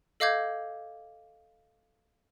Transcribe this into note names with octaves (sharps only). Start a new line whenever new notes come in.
A4 D#5 F5 D6 G6 G#6